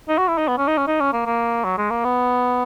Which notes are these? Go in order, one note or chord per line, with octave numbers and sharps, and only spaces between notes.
D#4
F#4
E4
D#4
B3
C#4
D#4
C#4
D#4
C#4
A#3
A#3
F#3
G#3
A#3
B3